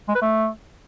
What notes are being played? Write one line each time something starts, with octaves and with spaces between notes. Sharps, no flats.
G#3
B4
A3